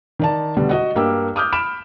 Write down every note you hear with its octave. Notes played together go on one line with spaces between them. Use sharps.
D#3 D5 A5
B2 D3 G3
F#4 D#5 F#5
G2 A#3 G4 E6
D6 D#6 F6 G6
B5 F6 D7 E7